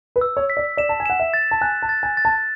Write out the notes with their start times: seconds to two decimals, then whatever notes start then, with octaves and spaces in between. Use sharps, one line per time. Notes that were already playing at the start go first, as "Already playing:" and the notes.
0.16 B4
0.21 E6
0.37 C#5
0.50 B6
0.57 D5
0.77 D5 E7
0.89 A5
1.00 G#5
1.06 F#5 E7
1.20 E5
1.34 A6
1.51 A5
1.61 G#5 F#6
1.82 A5
1.89 A6
2.03 G#5
2.17 A6
2.25 A5